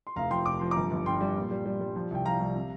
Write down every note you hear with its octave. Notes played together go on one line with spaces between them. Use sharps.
C6
F1 F5 A#5
F3 G5 C6
F1 D6
F3 C6
G1 A#5 D6
G1
G2 G5 C6
G3
A#2
G3
G3
G3
F3
C2 G5
F3 F5 A#5
C2
C3